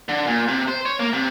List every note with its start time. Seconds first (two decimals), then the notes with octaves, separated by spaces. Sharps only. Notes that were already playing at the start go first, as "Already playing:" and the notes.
0.09 D3
0.27 A#2
0.48 C3
0.68 C5
0.86 C#5
1.00 A#3
1.13 C3